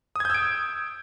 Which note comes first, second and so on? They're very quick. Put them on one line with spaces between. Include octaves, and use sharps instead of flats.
D#6 G#6 G6 E6 D7